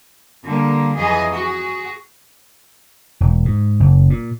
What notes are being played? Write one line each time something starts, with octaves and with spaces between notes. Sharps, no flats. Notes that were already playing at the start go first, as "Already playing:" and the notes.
D3 G3 A#3
F2 E3 F#3 G#4 D#5
F#4 G#4
E1
G#2
F#1
A#2